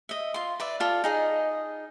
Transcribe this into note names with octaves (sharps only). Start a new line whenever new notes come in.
D#5 E5
F4 C6
B4 D5 E5
F4 A4 D5 F5
D#4 G#4 D#5